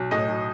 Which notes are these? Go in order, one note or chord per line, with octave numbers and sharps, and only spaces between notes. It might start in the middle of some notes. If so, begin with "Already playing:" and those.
Already playing: B1
A2 D#5
B1